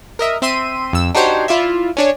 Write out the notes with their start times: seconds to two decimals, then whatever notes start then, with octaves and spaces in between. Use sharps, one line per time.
0.19 A#4 D#5 E5
0.42 C4 E5 C6 D#7
0.93 F2 E6
1.15 D4 D#4 F#4 G4 C5 C#5
1.48 E4 F4 D5 E5
1.97 C#4 D4 C#5